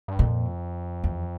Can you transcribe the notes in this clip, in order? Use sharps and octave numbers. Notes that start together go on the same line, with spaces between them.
G2
F2 A#2
E2